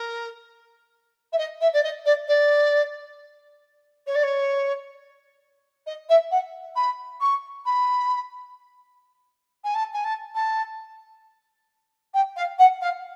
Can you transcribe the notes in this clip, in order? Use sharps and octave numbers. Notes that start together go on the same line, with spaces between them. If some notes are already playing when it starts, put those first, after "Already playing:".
Already playing: A#4
E5
D#5
E5
D5
D#5
D5
D5
C#5
D5
C#5
D#5
E5
F#5
B5
C#6
B5
G#5
A5
G#5
A5
A5
G5
F5
F#5
F5